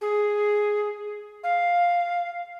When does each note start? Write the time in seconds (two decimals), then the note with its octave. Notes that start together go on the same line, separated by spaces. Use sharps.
0.01 G#4
1.43 F5